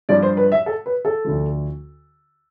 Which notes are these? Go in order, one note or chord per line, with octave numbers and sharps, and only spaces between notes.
G2 F3 D5
C5
B4
E5
A4
B4
A4
D2 D3 F3